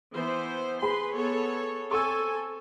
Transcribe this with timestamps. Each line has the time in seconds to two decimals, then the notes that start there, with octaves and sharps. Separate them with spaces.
0.13 E3 B3 C5
0.82 G#4 B4 B5 C6
1.16 B3 A4 C#5
1.91 C4 A4 G#5 C#6 E6